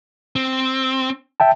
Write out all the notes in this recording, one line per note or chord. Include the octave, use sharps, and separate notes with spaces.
C4
E5 G5 A5